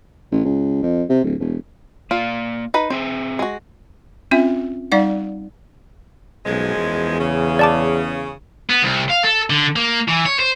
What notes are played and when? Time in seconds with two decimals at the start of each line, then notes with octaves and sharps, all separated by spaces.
0.32 A1
0.45 C#2
0.83 F2
1.10 C3
1.24 D1
1.40 E1
2.11 A#3 F4 D5
2.74 D#4 B4 B5
2.90 C4 G#4 C5 E5
3.39 G#3 F#4
4.31 C4 C#4 F4 E5
4.92 G3 D#4 D5 F5 F#5
6.45 B1 F#2 F3 G#3
6.77 E2
7.19 C#3
7.59 D5 A5 D6
8.70 B3
8.82 C2
9.09 F5
9.23 A4
9.50 D3
9.76 A#3
10.08 E3
10.26 C#5
10.39 C5